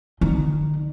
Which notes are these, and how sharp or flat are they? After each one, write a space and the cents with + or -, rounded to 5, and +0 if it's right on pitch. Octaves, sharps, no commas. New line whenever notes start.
D3 +35 D#4 +0